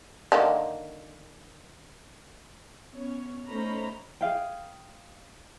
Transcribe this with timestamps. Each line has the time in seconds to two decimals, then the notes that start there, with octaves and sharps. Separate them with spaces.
0.32 D3 D#3 A#3
2.93 B3 C#4 C#5
3.48 A3 C#4 D#4 C5 A#5 B5
4.21 G#4 F5 G5